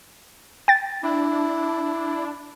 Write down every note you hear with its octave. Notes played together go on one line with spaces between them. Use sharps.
G5 A6
D4 E4